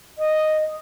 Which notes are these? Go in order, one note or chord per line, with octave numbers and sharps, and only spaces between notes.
D#5